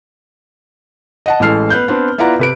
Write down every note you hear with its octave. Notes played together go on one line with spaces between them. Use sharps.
D#5 F#5 A5
A1 E3 G#3 A4 F6 C7
B3 F#6 G6
B3 C4 D4
B3 E4 F4 D5 F#5 A#5
C3 B4 D7